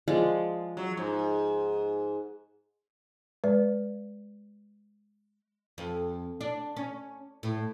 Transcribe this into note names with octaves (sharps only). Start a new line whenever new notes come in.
F3 G#3 D5
F#3
G#2
G#3 B4 D5
F2
D4
C#4
A2